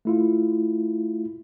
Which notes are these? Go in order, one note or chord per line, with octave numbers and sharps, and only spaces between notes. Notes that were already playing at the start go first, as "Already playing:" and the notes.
A3 E4 F4